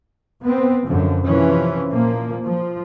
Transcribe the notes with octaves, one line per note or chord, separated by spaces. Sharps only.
B3 C4
F#2 D3 F3
C3 E3 F3 C#4
A#2 F3 A#3
F3